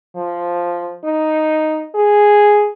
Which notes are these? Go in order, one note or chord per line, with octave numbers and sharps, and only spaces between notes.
F3
D#4
G#4